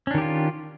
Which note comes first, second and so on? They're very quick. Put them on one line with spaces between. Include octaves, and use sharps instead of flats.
C#4 D4 D#3 G4 F4